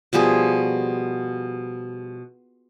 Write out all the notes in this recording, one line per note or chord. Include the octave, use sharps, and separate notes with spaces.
B2 F3 G3 G#4